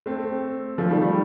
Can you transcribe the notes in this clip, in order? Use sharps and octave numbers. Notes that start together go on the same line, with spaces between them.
A3 C4
F3 A3
D#3 G3
D#3 G3